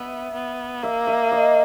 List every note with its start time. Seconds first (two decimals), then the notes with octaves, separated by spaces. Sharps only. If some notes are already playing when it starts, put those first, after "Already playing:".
Already playing: B3 E5
0.35 B3
0.83 A#3 E5
1.07 E5
1.32 D#5